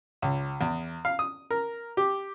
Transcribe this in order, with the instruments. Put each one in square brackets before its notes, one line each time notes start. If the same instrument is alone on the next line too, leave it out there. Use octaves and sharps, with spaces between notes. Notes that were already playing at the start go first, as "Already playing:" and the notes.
[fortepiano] C#2
E2
F5
D#6
A#4
G4